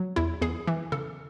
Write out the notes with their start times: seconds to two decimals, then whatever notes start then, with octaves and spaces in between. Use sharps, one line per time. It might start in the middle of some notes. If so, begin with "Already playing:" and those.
Already playing: F#3
0.16 E2 E4
0.41 E2 G#4
0.67 E3
0.92 C#3 A4